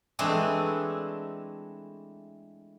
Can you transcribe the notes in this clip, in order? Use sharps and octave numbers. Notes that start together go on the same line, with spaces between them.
E3 G#3 A3 C4 D4 E4